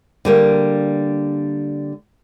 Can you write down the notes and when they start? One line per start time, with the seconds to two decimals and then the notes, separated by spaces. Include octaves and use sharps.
0.25 D3 G3 A#3